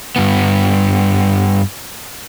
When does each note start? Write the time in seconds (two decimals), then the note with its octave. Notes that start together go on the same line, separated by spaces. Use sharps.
0.16 G2 B3